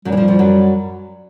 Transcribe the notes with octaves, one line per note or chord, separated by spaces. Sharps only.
F#2 F#3 G3
E3
F2 F3
F2 F3
F#2 F#3